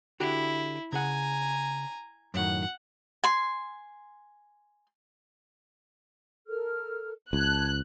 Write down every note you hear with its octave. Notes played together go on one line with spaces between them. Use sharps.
D3 E4 F#4 G4
C#3 G#4 F#5 G#5 A#5
F#2 A2 D#3 F#5
G#5 C6
A4 A#4 F6
C#2 A5 F#6 G#6